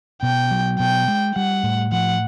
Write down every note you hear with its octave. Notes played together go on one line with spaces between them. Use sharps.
B2 G5
F#3
B2 G5
G#3
G3 F#5
A2
F3 F#5